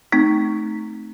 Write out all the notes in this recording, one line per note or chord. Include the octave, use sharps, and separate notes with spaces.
A3 C4 D#4